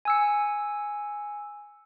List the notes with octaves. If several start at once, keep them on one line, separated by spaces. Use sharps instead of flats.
G#5 E6 C#7